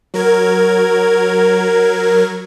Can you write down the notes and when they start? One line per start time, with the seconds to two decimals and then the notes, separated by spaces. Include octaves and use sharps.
0.14 F#3 A#4 G#6